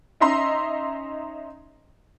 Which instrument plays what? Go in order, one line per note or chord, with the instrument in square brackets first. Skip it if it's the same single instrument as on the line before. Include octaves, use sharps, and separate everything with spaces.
[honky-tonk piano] C#4 D#4 D#5 E5 A#5 C6